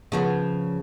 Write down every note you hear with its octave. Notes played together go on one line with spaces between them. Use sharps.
C#3 F3 B3